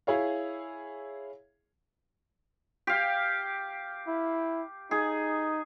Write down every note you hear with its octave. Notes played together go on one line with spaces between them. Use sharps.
E4 G#4 C#5 F5
G4 F5
E4
D#4 G#4